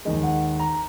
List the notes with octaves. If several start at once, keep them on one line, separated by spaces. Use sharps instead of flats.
D#2 D#3 G#3 D#5
F#5
A#5